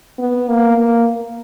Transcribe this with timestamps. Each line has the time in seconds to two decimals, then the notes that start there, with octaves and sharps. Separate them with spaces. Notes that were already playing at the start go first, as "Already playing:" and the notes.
0.19 B3
0.49 A#3
0.78 A#3